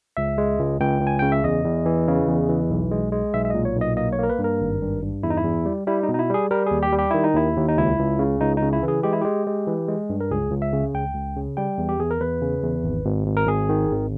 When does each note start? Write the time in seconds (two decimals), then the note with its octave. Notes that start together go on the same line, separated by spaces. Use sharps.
0.17 C#2 E5
0.38 G#3
0.59 C#2
0.80 C#2 G5
1.01 C#2
1.07 G#5
1.19 C#3 G5
1.32 E5
1.44 E2 D#5
1.65 E2
1.86 E3
2.08 C#3
2.28 E2
2.49 E3
2.70 B1
2.91 G#3
3.12 G#3
3.33 B1 E5
3.45 E5
3.50 A#2 D#5
3.65 C#5
3.76 B1
3.81 D#5
3.97 A#3 D#5
4.13 C#5
4.19 A#3 A#4
4.29 B4
4.39 G2
4.44 A#4
4.61 G#1
4.82 G2
5.02 G2
5.23 E2 E4
5.30 D#4
5.37 E4
5.44 E2
5.66 G3
5.87 G3 E4
6.03 D#4
6.09 B2
6.14 D#4
6.19 E4
6.30 G3 G#4
6.51 G3 A#4
6.66 D#2 G#4
6.83 G4
6.93 G3
6.99 G4
7.11 D#3 E4
7.24 D#4
7.35 D#2 E4
7.57 D#2
7.68 D#4
7.77 C#2 E4
7.99 C#2
8.19 C#3
8.41 C#2 D#4
8.57 D#4
8.62 C#3
8.73 E4
8.83 E3
8.88 G#4
9.03 G#3 G4
9.13 E4
9.21 G#3 G4
9.47 G#3
9.67 E3
9.88 G#3
10.10 G2
10.21 A#4
10.31 C#2 G#4
10.51 C#2
10.62 E5
10.73 C#3
10.95 C#2 G5
11.15 C#2
11.36 C#3
11.57 G3 G5
11.78 E2
11.89 G4
11.99 E2 G#4
12.11 A#4
12.21 E2 B4
12.41 C#3
12.63 E2
12.84 G#1
13.05 G#1
13.27 G#1
13.37 A#4
13.48 G#1 G#4
13.69 D#3
13.90 G#1